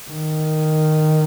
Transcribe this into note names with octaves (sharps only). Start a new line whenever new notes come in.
D#3